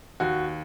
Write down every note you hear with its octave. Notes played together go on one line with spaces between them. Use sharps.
D#2 F#4